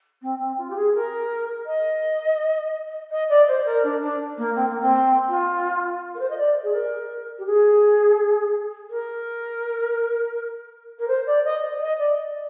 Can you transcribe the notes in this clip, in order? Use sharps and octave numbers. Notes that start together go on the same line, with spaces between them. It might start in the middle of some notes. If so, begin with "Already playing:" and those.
C4
C4
F4
G4
G#4
A#4
D#5
D#5
D5
C5
A#4
D4
D4
A#3
C4
A#3
C4
F4
A#4
C5
D#5
D5
G#4
A#4
G4
G#4
A#4
A#4
C5
D5
D#5
D#5
D5